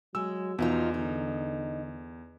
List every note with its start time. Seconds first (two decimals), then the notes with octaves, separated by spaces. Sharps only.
0.15 F#3 G#3 E6
0.59 E2 B2 F3 D#4 F4
0.94 D3 D#4